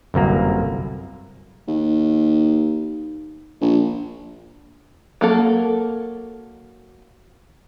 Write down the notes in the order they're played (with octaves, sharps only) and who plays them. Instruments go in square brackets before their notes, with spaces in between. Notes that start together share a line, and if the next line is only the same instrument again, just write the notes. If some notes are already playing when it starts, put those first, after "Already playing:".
[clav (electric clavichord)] G1 C2 F#2 A#3
[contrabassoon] D#2
A#1
[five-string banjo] F#3 A#3 A4